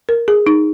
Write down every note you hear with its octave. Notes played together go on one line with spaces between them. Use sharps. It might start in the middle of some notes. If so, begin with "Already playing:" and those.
A#4
G#4
D#4